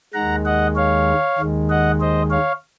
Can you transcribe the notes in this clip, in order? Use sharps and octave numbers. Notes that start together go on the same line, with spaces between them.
D#2 D#3 G#3 F#5 A#5
D#5 F#5
C#5 F5
D#2 D#3 G#3
D#5 F#5
C5 D#5
C#5 F5